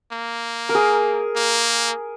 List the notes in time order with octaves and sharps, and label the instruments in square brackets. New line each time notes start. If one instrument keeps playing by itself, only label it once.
[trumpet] A#3
[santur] A#4
G#4
[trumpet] A#3